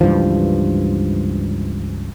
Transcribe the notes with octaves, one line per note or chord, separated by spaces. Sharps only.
C#2 G2 E3 F3